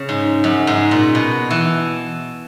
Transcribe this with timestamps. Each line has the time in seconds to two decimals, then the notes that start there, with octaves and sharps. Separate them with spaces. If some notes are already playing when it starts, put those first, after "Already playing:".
Already playing: C#3
0.09 G#2
0.44 F#2
0.67 G#2
0.91 A#2
1.15 B2
1.51 E3